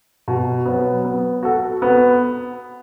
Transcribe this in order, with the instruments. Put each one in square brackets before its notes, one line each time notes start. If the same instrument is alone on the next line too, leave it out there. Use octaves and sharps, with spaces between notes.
[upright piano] B2
F#3 B3
B3
F#4 A4
B3